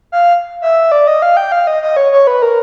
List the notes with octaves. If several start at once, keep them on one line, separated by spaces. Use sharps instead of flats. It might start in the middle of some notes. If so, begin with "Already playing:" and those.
F5
E5
D5
D#5
F5
G5
F5
D#5
D#5
C#5
C#5
B4
A#4